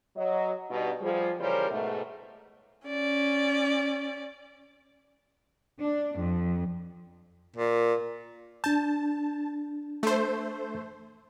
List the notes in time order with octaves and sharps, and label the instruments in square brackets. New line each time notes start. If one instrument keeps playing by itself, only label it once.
[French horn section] F#3 D#5
G2 B2 D#4
F3 G3 G#4
C#3 E3 G3 C#4 A#4 C5
G#2 B2 A3
[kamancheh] C#4 D5
[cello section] D4
F2
[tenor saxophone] A#2
[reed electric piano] D4 G6 [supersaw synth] A5
[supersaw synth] A3 C5